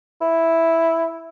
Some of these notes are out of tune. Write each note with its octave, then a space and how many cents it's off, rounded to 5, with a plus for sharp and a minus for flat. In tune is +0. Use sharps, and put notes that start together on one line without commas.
E4 +0